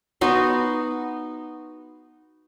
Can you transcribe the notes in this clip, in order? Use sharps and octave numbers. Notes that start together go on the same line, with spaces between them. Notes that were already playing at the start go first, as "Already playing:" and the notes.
B3 D#4 F#4 C6